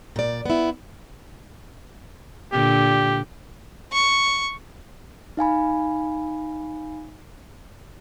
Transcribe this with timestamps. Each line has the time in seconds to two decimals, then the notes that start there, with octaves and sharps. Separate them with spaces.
0.16 A#2 D5
0.46 B3 E4
2.52 A#2 D3 G4
3.92 C#6
5.37 D#4 F5 G#5 B5